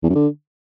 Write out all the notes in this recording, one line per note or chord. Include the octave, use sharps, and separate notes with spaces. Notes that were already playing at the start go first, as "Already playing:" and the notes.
E2
F#2
D3